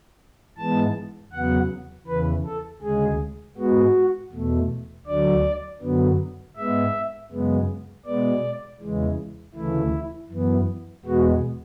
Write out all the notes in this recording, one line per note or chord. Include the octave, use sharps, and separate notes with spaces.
G#2 E3 G#3 B3 A5
E2 C#3 F#3 B3 F#5
E2 C#3 E3 B4
A4
D2 C#3 G#3 G#4
G#2 G#3 B3 F#4
E2 B2 A3
D2 D3 F#3 D5
F#2 D3 F#3 B3
G#2 G#3 B3 E5
F#2 C#3 G#3 B3
B2 G#3 B3 D5
E2 C#3 E3 G#3
D2 C#3 E3 A3 E4
F#2 E3 B3
E2 B2 G#3 B3 F#4